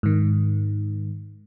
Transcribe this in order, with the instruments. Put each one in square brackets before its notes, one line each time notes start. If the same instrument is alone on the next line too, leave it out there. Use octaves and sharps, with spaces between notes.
[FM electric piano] G#2 D#3